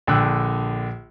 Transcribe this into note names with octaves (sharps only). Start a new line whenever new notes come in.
A#1 D3 G5 E6 F#6